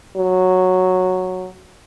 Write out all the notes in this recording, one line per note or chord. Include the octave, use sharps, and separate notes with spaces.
F#3